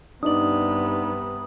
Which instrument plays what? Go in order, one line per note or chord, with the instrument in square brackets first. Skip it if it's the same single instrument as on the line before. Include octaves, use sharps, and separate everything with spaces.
[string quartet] G2 C3 B3 [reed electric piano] D4 D#4 D5 [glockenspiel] D#6 F#7